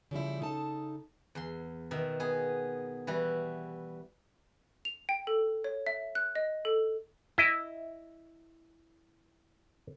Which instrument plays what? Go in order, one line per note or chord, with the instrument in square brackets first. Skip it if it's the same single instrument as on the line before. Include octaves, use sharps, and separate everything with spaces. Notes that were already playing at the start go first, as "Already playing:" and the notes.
[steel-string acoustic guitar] C#3 F3 G3 E4
C#3 D#4 A4 A5
[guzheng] E2 C6
B2 D#3 E5
B3 G#4
E3 G3 E4 F#4
[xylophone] F7
G5
A4
C#5
E5
F#6
D#5
A4
[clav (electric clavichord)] E4 D#5